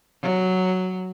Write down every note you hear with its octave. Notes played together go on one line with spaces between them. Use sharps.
F#3